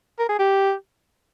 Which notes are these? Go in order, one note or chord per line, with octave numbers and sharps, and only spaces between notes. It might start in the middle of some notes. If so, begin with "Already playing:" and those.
A#4
G#4
G4